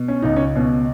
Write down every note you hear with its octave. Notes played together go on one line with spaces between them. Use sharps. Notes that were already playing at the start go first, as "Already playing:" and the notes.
Already playing: B2
C#4
C#2 D#4
C#4
B2 C#4